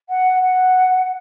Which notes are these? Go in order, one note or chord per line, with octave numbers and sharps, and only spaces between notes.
F#5
F#5